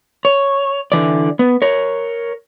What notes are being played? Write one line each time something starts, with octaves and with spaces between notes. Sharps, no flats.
C#5
D3 E3 D5
B3
A#4 C#5